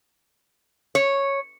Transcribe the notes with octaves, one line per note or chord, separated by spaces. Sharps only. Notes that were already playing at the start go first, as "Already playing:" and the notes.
C#5